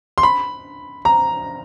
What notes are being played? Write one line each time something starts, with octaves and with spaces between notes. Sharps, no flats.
C6
B5
A#5